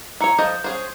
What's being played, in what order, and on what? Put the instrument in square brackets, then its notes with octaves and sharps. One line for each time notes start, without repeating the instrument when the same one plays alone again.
[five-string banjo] E4 C#5 [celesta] A#5 C#7
[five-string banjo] F3 A4 D#5 [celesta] G6
[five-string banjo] C#4 G#4 C5